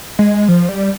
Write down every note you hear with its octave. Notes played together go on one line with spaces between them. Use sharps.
G#3
F3
G3